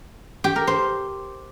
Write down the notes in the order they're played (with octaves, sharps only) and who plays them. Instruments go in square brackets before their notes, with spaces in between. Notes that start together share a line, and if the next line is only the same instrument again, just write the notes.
[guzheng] G4
A#4
C5